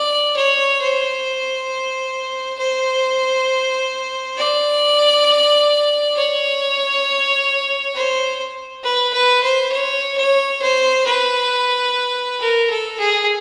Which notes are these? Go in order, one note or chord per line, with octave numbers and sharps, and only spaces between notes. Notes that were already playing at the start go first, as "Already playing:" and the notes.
Already playing: D5
C#5
C5
C5
D5
C#5
C5
B4
B4
C5
C#5
C#5
C5
B4
A#4
A4
G#4